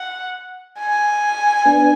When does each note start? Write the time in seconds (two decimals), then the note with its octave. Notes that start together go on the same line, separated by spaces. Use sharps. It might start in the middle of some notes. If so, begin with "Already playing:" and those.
Already playing: F#5
0.80 G#5
1.65 B3 D4